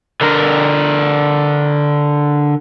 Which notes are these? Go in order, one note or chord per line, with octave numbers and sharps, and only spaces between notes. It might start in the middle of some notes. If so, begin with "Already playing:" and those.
D3 A#4